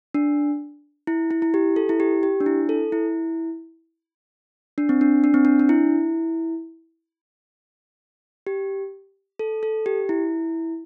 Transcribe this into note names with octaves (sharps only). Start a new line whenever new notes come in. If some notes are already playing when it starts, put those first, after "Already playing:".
D4
E4
E4
E4
G4
A4
E4
G4
G4
D4
E4
A4
E4
D4
C4
D4
D4
C4
D4
D4
E4
G4
A4
A4
G4
E4